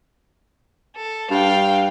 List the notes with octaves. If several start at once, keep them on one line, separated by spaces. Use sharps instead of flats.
A4
G2 F5 G5